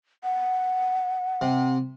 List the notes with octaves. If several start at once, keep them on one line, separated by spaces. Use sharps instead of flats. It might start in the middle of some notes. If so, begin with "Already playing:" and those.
F#5
C3